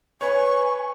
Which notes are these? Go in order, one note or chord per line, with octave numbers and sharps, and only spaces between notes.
B4 C#5 G#5 C#6